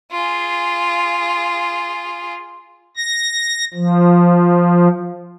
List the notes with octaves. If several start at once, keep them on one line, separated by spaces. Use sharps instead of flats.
F4 G#4
A#6
F3